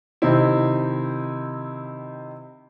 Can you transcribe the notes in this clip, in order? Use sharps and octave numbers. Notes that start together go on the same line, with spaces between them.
C3 D#3 C4 D#4 E4